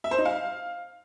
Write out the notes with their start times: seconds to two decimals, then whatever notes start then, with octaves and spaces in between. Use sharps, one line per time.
0.04 E5
0.11 C5
0.18 D#4
0.25 F5